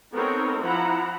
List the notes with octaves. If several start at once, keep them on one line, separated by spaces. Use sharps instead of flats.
B3 C4 D#4 A4 A#4 C#5
F3 E4 F#5 A#5 B5